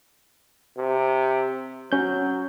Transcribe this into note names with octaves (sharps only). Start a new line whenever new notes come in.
C3
F#3 C#4 G6